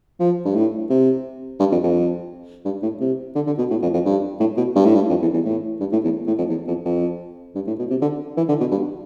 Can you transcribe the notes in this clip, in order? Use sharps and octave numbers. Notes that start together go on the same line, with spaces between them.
F3
G2
A2
C3
G2
F2
F2
G2
A2
C3
D3
D3
B2
A2
F2
F2
G2
A2
B2
G2
A2
G2
F2
E2
E2
A2
G2
A2
E2
A2
F2
E2
F2
F2
G2
A2
B2
C3
D3
E3
D3
B2
G2